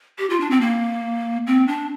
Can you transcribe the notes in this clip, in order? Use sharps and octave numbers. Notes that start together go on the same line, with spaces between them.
G4
F4
D4
C4
A#3
C4
D4